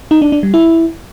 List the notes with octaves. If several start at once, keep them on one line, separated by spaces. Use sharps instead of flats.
D#4
D4
D4
G3
E4